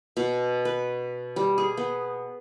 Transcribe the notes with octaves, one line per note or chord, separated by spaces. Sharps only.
B2
B4
G3
G#4
B3